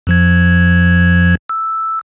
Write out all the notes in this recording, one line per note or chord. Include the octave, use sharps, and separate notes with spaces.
F2 F3 G#6
E6